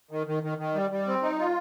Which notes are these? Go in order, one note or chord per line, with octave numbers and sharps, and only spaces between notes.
D#3
D#3
D#3
D#3
G3
G3
C4
D#4
F4